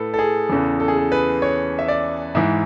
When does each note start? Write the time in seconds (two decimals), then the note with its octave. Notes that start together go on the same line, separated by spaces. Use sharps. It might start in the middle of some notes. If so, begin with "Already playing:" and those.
Already playing: A2 A4 B4
0.14 A4
0.19 G#4
0.49 E2 C#3 E3 A4
0.80 A4
0.88 G#4
0.98 A4
1.12 B4
1.42 C#5
1.79 E5
1.88 D5
2.35 G#2 E3 E5